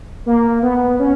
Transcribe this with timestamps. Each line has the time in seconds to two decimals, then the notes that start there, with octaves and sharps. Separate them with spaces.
0.26 A#3
0.63 B3
0.99 C#4